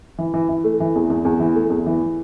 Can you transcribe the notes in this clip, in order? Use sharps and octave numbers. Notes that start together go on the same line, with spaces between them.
E3
E3
E3
A3
E3
E2
E2
E2
E3
A3
E2
E3